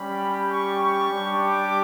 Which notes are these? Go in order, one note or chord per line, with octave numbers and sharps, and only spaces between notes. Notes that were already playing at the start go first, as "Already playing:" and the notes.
Already playing: G3 C#4 G4 B5
C#6
C#6
G3 D4 G4
D6